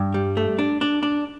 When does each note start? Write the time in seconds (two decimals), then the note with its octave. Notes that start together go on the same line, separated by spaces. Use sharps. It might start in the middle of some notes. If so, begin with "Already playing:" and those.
Already playing: G2
0.14 G3
0.37 A3
0.59 D4
0.81 D4
1.03 D4